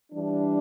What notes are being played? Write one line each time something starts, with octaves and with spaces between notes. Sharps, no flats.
E3 G3 D4